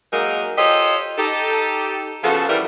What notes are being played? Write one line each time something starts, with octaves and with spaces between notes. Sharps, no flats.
F#3 G#3 A#3 D#4 A#4
F4 G4 A4 C5 C#5 D#5
D#4 G4 A4
C#3 F3 B3 F#4 A4
E3 G3 A#4